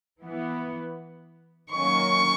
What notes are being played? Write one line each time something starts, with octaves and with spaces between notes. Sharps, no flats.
E3 B3
D#3 F#3 A#3 C#4 C#6